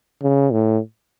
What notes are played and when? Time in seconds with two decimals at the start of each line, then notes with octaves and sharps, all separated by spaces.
0.23 C#3
0.52 A2